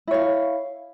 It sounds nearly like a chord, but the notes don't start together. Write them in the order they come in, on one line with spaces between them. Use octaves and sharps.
E4 C#5 F5